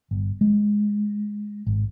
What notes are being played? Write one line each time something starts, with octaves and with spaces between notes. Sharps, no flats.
G1
G#3
G#1